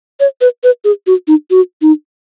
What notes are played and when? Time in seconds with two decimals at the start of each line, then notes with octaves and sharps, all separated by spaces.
0.20 C#5
0.41 B4
0.64 B4
0.84 G#4
1.07 F#4
1.28 D#4
1.51 F#4
1.82 D#4